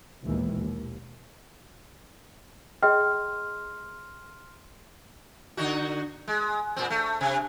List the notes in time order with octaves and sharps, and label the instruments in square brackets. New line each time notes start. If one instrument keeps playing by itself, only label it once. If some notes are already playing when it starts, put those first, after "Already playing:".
[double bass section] A#1 D#2 B2 D#3 E3 G#3
D#2
[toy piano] G#4 D#5 G5 [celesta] C6 F6
[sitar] D3 D#4 F#4
G#3
A#2 C4
A3
C3